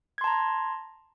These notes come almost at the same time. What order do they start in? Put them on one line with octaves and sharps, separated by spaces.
G#6 C6 A5 A#5